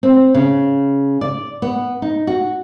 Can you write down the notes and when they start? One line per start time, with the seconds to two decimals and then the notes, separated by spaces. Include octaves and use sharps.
0.03 C4
0.34 C#3
1.21 D5
1.62 B3
2.02 D#4
2.27 F#4